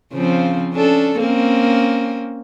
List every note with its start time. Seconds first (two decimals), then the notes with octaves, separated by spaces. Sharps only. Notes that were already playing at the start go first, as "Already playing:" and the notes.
0.13 C#3 F3 C4
0.73 C#4 D4 A4
1.19 A#3 C4 C#4